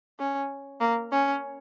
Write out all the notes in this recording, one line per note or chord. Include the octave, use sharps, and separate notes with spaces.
C#4
A#3
C#4